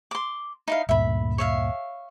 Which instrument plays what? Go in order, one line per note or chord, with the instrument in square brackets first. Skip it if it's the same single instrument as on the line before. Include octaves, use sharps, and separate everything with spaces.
[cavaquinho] C6 D6
D#4 E4 F5
[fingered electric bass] D2 G2 A#2 [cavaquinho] E5 B5
[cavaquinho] C#5 E5 F5